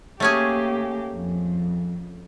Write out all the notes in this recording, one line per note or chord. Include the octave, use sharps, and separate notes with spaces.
A3 A#3 C#4 G4 G#4
F2